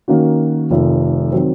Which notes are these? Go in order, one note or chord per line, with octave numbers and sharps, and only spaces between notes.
D#3 A#3 C#4 F#4
F1 F2 D#3
D#3 F#3 C4